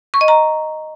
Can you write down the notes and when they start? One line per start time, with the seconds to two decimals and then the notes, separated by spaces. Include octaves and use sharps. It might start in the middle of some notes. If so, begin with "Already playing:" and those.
0.14 C#6
0.21 D#5
0.28 A#5